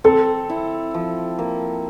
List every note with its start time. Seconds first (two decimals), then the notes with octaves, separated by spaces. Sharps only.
0.04 C4 A4
0.49 E4
0.94 F3
1.39 A#3